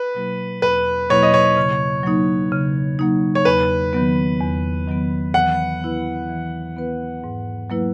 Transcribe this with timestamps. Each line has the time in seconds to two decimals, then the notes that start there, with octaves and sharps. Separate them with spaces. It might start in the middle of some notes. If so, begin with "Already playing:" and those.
Already playing: B4
0.15 B2 F#3 A#3 E4
0.62 E2 B4
1.09 B2 F#3 A#3 E4 C#5
1.22 D#5
1.34 C#5
1.57 C#3
2.03 F#3 A#3 D#4
2.52 C#3
2.99 F#3 A#3 D#4
3.35 C#5
3.45 E2 B4
3.93 D#3 F#3 B3
4.40 E2
4.88 D#3 F#3 B3
5.34 E3 F#5
5.81 B3 E4 B4
6.29 E3
6.76 B3 E4 B4
7.24 G#2
7.70 F#3 A#3 E4 B4